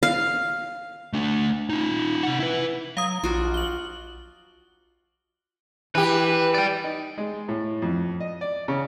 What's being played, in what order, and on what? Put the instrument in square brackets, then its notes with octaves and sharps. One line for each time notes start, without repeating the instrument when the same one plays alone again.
[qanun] F5
[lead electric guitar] A3 D4
D#4 F4
C3 F#5
E4 B4
[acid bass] F#3 [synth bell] F5 A#5 D#6
[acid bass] A#1 [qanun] F4 F#4 D5
[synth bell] F#7 G7
[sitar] E3 G4 [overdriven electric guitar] B4
[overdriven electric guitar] D5 G5
[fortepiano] D#4
G#3
A2
F2
D#5
D5
C#3